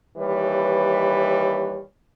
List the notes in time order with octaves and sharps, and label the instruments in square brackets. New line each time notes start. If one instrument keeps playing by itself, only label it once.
[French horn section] D#2 E3 G3 B4 C#5